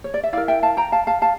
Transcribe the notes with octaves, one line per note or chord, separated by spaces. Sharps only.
C#5
D5
E5
E4 A#4 D5 F5
E5 G5
F5 A5
G5 A#5
F5 A5
F5 A5
F5 A5